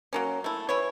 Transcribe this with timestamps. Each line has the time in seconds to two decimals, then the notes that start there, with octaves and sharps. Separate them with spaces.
0.13 F#3 A#3 C#4
0.44 A3 E4
0.69 E3 E4 C#5